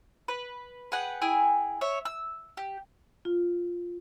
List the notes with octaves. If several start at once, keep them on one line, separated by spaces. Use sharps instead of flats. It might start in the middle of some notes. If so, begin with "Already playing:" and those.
B4
G#4 B4 F#5 G5
E4 G#4 G5 G#5
C#5 E5
E6
G4
F4